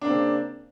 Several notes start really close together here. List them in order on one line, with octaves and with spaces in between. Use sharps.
D4 A#3 C4 C#3